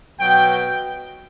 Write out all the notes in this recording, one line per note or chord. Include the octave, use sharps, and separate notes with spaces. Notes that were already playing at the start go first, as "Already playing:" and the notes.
B2 F#3 G5